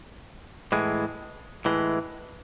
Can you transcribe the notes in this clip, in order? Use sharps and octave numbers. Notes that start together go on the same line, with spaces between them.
A2 E3 G#3
A2 E3 G#3